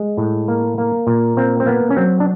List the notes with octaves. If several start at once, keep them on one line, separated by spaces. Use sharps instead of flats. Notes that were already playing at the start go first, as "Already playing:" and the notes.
Already playing: G#3
A2
A#3
A#3
A#2
A#3 C4
C4
A#3 B3
C#4
F#3 C4
D4